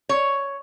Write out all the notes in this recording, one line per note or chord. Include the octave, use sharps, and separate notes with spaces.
C#5